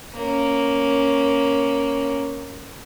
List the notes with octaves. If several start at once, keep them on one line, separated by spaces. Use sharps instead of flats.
A#3 C#4